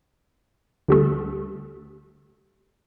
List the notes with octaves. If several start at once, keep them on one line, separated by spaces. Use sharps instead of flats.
D2 G3 A3